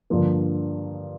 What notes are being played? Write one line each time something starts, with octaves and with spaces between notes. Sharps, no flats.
G2 D3 F3 A#3